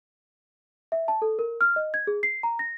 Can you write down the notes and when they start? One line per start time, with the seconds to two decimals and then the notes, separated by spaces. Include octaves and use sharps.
0.92 E5
1.08 A5
1.22 A4
1.39 A#4
1.61 F6
1.76 D#5
1.94 G#6
2.07 G#4
2.23 C7
2.43 A#5
2.59 A#6